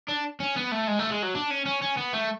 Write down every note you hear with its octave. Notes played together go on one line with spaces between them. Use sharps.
D4
C#4
B3
A3
G#3
A3
G#3
F#3
D4
C#4
C#4
C#4
B3
A3